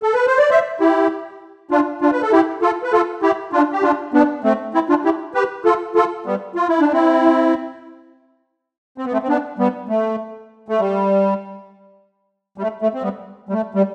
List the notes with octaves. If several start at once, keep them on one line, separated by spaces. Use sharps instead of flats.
A4
B4
C5
D5
C5 E5
E4 G4
D4 F4
D4 F4
B4
A4
E4 G4
F4 A4
B4
F4 A4
E4 G4
D4 F4
G4
D4 F4
B3 D4
A3 C4
C4 E4
D4 F4
E4 G4
G4 B4
F4 A4
F4 A4
G3 B3
F4
E4
D4
C4 E4
C4
B3
A3 C4
C4
B3 D4
G3 B3
A3
A3
G3
G3
A3
A3
C4
G3 B3
G3
A3
G3